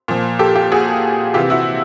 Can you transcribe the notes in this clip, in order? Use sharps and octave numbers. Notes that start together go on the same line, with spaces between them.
A#2 F3
G4 A4
F4 G4
F#4 G#4
C3 E3 F4 G4
E4 F#4